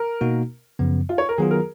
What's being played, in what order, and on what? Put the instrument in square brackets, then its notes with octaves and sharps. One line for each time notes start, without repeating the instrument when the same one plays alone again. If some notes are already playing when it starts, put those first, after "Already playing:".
Already playing: [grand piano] A#4
[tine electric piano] B2 A#3 D#4 F#4
F#2 C#3 F3 B3
[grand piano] F4
C#5
A#4
[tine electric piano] D#3 F#3 B3 F4 [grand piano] G#4
[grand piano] A#4